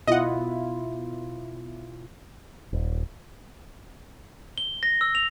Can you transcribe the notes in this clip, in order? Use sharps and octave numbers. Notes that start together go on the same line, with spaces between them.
B2 E4 F4 D#5 F#5
D#1
G7
A#6
E6
F7